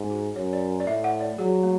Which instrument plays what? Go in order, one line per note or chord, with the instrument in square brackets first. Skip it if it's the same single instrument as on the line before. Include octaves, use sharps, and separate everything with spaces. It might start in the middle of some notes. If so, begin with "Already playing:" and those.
Already playing: [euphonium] G#2
[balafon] F#4
[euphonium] F#2 [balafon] C#5
[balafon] D5
D5
[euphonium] A2 [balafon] E5
[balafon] F#5
D5
[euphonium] F#3 [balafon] G#4
[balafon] A3